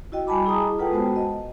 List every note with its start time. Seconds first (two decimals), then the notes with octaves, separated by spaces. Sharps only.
0.12 E4 F#4 D#5 G5
0.27 G3 G#5 A5 B5 D6
0.46 E4 G#4 D#5 A#5 D#6
0.79 F4 A4 B4 F#5 G5 A5
0.92 G#3 B3 F#4 C5 A5
1.16 D#5